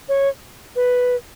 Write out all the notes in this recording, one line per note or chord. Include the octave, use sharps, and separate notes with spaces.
C#5
B4